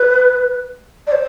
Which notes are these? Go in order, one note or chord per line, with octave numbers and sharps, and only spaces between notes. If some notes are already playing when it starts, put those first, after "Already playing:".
Already playing: B4
D5
C5